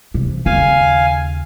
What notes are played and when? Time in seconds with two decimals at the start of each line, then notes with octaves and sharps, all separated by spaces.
0.14 C3 E3
0.46 D#2 C#3 F5 G#5